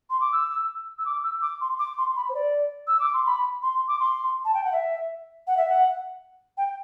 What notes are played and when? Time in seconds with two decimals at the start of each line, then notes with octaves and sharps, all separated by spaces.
0.10 C6
0.21 D6
0.32 E6
0.98 E6
1.06 D6
1.24 E6
1.42 D6
1.61 C6
1.79 D6
1.98 C6
2.16 B5
2.29 C5
2.35 D5
2.87 E6
3.00 D6
3.14 C6
3.26 B5
3.62 C6
3.88 D6
4.00 C6
4.45 A5
4.54 G5
4.64 F#5
4.72 E5
5.47 F#5
5.57 E5
5.69 F#5
6.58 G5